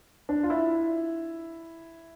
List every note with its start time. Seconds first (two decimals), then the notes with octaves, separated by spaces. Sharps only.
0.29 D4
0.43 F4
0.50 E4